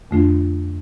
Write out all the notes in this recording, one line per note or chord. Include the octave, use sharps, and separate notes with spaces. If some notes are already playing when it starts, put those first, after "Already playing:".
F2 D3 A3 D4 F4